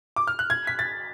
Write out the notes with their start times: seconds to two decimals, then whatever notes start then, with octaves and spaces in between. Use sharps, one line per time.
0.16 D6
0.27 F6
0.39 F#6
0.50 G#6
0.67 B6
0.79 A6